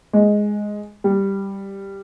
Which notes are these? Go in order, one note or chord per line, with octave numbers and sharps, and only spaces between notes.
G#3
G3